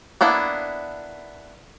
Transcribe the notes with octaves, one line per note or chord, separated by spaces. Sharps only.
A#3 B3 D4 E4